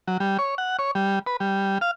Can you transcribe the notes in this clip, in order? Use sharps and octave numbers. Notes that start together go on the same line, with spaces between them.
F#3
G3
C#5
F#5
C#5
G3
B4
G3
F5